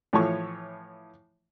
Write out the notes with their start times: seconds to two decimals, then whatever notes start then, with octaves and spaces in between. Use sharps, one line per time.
0.13 A2 E3 F3 C#5 A5 C#6